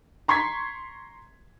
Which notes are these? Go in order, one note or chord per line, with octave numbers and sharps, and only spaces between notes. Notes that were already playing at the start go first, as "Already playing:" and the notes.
A#5 C6 C#6 G#6 B6